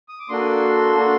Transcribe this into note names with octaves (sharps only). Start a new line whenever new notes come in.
D#6
D6
A#3 D4 F#4 A4 C6
A#3 D4 F#4 A4